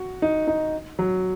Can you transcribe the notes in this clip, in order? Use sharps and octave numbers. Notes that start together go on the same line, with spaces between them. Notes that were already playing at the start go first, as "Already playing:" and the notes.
Already playing: F#4
D#4
D#4
F#3